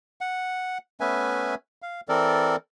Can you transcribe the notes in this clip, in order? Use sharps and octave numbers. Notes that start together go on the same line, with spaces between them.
F#5
A3 B3 C#4 B4 E5 G#5
F5
E3 C4 A4 A#4 D5